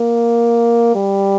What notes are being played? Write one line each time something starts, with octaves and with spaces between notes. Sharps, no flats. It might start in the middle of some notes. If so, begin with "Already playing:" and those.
Already playing: A#3
G3